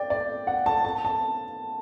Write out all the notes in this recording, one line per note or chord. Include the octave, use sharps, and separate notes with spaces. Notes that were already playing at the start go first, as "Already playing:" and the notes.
Already playing: D5 G5
D5
F#5
A5
A5
A5